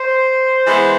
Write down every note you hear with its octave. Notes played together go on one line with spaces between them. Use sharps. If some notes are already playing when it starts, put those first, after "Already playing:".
Already playing: C5
E3 G#3 B3